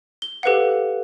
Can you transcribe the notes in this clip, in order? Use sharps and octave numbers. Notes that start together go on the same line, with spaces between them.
G7
G4 A4 B4 C5 F5 F#5